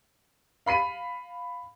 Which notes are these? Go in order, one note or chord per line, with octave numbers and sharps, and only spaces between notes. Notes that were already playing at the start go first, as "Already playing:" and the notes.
F5 B5 C7 D#7